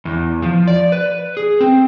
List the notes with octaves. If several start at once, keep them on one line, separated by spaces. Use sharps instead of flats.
E2
F3
D5
B4
G#4
C4